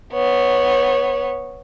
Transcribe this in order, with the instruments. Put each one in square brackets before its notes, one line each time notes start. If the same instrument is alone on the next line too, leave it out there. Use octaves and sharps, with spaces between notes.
[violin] B3 C#5